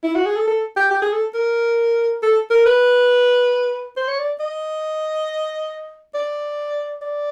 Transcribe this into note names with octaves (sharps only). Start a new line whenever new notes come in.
E4
F#4
G#4
A4
A4
G4
G4
G#4
A4
A#4
A4
A#4
B4
C5
C#5
D5
D#5
D5
D5